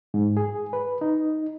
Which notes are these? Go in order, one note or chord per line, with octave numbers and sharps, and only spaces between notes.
G#2
G#4
B4
D#4